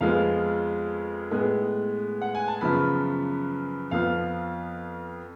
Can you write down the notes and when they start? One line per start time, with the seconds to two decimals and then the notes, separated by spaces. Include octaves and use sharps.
0.01 F2 F3 G#3 B3 F5
1.31 A2 G#3 B3
2.21 F#5
2.35 G#5
2.48 A5
2.61 F#2 C#3 F3 B3 B5
3.91 F2 F3 B3 F5